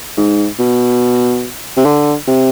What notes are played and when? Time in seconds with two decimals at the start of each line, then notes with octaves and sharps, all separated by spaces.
0.17 G#2
0.59 B2
1.77 C3
1.85 D3
2.27 C3